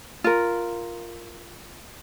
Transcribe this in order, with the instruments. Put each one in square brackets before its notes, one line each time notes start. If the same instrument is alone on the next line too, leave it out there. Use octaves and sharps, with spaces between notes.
[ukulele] F4 A#4